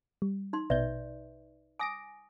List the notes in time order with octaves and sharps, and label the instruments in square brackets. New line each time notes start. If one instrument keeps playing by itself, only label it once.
[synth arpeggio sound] G3
[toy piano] D#4 C6
[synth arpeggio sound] A#1 B2 G6 [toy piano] B4 D5 E5
[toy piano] G#5 D#6 [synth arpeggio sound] D6 A#6 D7